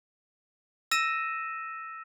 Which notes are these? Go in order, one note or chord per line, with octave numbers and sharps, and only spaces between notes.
E6 A#6 D#7 E7